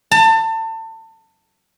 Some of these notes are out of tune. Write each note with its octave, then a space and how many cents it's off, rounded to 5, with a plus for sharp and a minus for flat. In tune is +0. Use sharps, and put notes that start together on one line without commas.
A5 +30